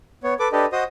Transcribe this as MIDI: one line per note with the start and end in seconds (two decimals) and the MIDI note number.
0.24 0.34 59
0.24 0.34 73
0.40 0.48 69
0.40 0.48 71
0.40 0.48 86
0.52 0.66 62
0.52 0.66 67
0.52 0.66 69
0.52 0.66 71
0.52 0.66 75
0.72 0.84 66
0.72 0.84 72
0.72 0.84 75
0.72 0.84 87